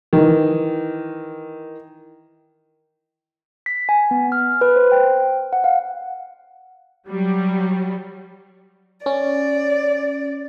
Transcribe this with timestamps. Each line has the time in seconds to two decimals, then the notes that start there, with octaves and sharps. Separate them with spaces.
0.13 D#3 E3
3.66 B6
3.89 G#5
4.11 B3
4.32 F6
4.61 B4
4.76 C5
4.92 G5
5.53 F#5
5.64 F5
7.09 F#3 G3
9.06 C#4 D5